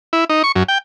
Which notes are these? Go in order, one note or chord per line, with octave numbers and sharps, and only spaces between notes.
E4
D#4
C#6
F#2
G5